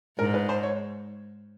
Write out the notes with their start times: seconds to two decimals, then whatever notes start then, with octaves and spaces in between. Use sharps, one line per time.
0.19 G#2 A#4
0.34 B4
0.49 C5
0.63 C#5